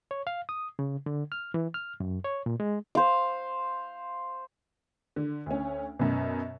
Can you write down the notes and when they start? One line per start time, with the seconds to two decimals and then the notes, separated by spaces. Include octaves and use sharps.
0.11 C#5
0.27 F5
0.49 D#6
0.79 C#3
1.06 D3
1.32 F6
1.54 E3
1.74 F6
2.00 F#2
2.25 C#5
2.46 A#2
2.60 G#3
2.95 C5 F5
5.16 D3
5.46 D2 C#4
5.99 F#2 B2